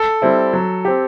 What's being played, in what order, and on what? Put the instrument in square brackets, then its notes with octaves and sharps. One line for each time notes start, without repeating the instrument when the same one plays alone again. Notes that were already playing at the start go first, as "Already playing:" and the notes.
Already playing: [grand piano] A4
[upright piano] G3 C4 E4
F#3
C4 G4